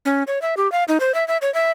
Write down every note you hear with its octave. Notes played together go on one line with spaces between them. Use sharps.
C#4
C#5
E5
G4
F5
D#4
C5
E5
E5
C#5
E5